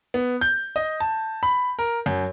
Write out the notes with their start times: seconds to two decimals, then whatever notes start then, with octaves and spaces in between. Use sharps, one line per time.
0.14 B3
0.41 G6
0.76 D#5
1.00 A5
1.43 B5
1.79 A#4
2.06 F#2